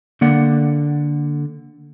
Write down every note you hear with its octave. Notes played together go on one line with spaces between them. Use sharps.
D3 A#3 D5 F#5